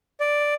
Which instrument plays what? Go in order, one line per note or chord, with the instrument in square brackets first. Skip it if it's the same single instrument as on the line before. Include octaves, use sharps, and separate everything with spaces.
[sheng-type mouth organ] D5